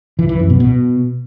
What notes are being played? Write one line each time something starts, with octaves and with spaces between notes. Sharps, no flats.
E3
E3
F#2
B2
B2